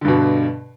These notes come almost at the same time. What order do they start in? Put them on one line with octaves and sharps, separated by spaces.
D3 G2 B2